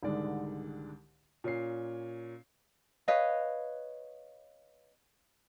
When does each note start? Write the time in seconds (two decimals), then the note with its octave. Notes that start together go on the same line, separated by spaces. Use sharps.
0.03 C2 G#2 D3 D#3 G#3 D5
1.44 A#2 C#4 C7
3.08 B4 C#5 D#5 F5